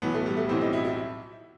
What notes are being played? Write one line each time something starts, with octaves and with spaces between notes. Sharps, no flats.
B1 A2 E3 B3
A3
G3
A3
B1 A2 E3 C4
D#4
E4
E4